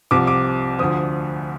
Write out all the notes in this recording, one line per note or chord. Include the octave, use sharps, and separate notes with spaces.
C2 C3 F3 D6
D6
D2 D3 F3 D#6